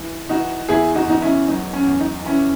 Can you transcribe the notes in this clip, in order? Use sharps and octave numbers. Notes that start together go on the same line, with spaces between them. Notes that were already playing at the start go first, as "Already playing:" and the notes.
Already playing: E3
E3 D#4 F#4
E2 E4 G#4
D#4 F#4
E2 D#4
C#4 E4
F#3 D#4
C#4
E2
D#4
E3 C#4 E4